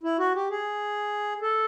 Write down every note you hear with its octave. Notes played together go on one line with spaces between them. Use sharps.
E4
F#4
G4
G#4
A4